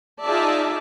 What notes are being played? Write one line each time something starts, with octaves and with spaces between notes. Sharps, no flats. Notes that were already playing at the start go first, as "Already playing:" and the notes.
D#4 F4 G#4 D5 E5 A5